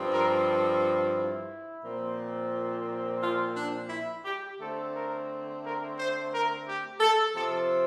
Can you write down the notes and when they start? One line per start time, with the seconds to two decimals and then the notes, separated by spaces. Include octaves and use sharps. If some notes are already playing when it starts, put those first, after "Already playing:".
Already playing: G2 F3 C4
0.11 A#4
0.45 A4
1.14 E4
1.84 A#2 F3 C4
3.22 F4
3.56 D4
3.90 E4
4.25 G4
4.59 D3 A3 C4 A4
4.94 A#4
5.63 A#4
5.97 C5
6.31 A#4
6.66 G4
7.00 A4
7.35 C3 F3 C4 A4